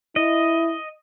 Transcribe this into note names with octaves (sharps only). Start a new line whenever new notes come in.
E4 D#5